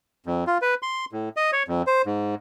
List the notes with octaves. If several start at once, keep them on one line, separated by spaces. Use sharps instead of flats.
F2
F4
B4
C6
A2
D#5
C#5
F2
C5
G#2